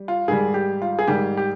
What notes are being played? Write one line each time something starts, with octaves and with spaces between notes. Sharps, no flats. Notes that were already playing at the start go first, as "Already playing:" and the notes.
Already playing: G3
F4
G#2 D#3 G3 G#4
G4
F4
G#4
G#2 D#3 G3 G4
G4